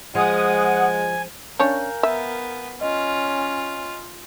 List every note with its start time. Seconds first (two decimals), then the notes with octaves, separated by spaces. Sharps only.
0.15 F3 G#3 F#5 G#5 D#6
1.59 C#4 D4 A#4 C#5 F5 G#5 G6
2.03 B3 E5
2.81 C#4 F4 D#5